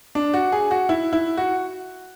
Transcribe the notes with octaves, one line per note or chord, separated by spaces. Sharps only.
D4
F#4
G#4
F#4
E4
E4
F#4